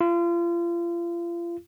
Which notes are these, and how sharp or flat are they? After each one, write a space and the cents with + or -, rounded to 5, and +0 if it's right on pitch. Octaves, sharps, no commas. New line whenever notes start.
F4 -35